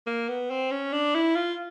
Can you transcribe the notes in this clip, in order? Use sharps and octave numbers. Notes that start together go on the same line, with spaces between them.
A#3
B3
C4
C#4
D4
E4
F4